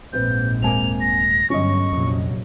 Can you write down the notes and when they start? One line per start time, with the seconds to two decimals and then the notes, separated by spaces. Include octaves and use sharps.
0.13 A#1 G#2 C4 B4 G6
0.62 D#1 G#3 A#3 C4 G#5 F7
1.00 A#6
1.50 G1 F#3 C#4 D#5 C#6
1.92 A#1 F2 C3 F#3